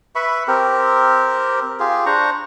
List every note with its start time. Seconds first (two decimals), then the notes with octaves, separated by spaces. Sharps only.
0.15 B4 E5 B5 C#6
0.48 C4 G4 A#4
1.80 F4 G4 G#4
2.06 D4 C5 A#5 C#6